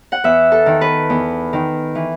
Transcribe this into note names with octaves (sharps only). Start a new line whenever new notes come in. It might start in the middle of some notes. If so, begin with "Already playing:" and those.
F#5
E2 E5
A4
D#3
B4
E2
D#3
E3